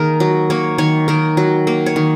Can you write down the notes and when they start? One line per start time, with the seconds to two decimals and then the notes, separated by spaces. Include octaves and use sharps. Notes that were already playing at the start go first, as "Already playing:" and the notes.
Already playing: D#3 A#3 G#4 A#4
0.20 F#3
0.50 A#3 C#5
0.78 D#3 C#5
1.08 D#3 A#4
1.37 F#3
1.67 A#3
1.86 C#5
1.96 D#3